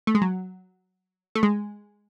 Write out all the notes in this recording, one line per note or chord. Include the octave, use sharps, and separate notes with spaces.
A3
G#3
F#3
A3
G#3